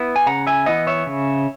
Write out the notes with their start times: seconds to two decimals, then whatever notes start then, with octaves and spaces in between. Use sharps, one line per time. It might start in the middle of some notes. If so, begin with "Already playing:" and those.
Already playing: B3 E4
0.16 G#5
0.27 C#3 F#5 A#5
0.47 E5 G#5
0.66 E3 B3 E4 D#5 F#5
0.87 C#5 E5
1.06 C#3